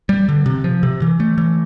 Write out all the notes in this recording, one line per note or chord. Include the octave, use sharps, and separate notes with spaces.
G3
D3
C3
F3
C3
E3
A3
E3